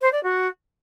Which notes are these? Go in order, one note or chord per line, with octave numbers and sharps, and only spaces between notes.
C5
D5
F#4